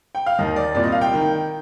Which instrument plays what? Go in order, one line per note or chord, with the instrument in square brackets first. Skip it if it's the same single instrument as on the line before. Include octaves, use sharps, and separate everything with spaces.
[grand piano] G5
F5
D#2 D#3 D#5
D5
C2 A#2 D5
D#5
F5
G5
D#3